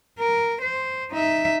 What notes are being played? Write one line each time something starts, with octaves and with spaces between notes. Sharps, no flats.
A#4
C5
D#4 E5